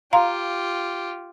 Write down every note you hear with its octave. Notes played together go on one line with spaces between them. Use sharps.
F4 G4 F5 A#5 C6